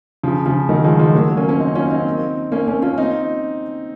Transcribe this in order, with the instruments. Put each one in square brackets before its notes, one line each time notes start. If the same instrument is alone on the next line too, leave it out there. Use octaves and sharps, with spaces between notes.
[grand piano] C#3 F3
C#3 F3
D#3 F#3
F3 G#3
F3 G#3
F#3 A#3
A#3 C#4
A#3 C#4
C4 D#4
C#4 F4
C4 D#4
A#3 C#4
A#3 C#4
C#4 F4
C4 D#4